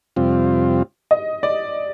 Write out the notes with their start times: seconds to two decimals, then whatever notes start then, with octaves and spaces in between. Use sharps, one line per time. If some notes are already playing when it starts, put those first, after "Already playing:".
0.16 F2 C3 G3 C4 F4
1.11 D#5
1.43 D5